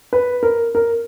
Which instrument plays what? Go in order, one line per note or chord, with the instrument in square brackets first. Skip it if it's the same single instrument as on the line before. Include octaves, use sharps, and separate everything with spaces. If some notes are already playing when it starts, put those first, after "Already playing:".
[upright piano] B4
A#4
A#4